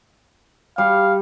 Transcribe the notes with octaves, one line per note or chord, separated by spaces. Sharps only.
G3 F5